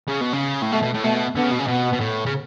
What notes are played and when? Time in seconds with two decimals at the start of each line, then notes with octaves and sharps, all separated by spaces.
0.08 C#3
0.21 B2
0.33 C#3
0.62 A2
0.72 B2 A3
0.83 B2
0.94 A2
1.04 B2 A3
1.36 D3 B3
1.44 C#3
1.51 B2
1.59 C#3
1.68 B2 B3
1.93 B2
2.01 A2
2.26 C#3